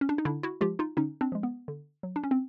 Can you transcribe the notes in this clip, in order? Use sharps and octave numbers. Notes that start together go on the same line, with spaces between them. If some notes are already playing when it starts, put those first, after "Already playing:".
C#4
D4
D#4
D3 D4 E4
E4 F#4
F3 G#3 F4 G4
D#4 F4
D3 C#4 D#4
C4 D4
F3 G#3
B3
D3
F#3
D4
C#4
C4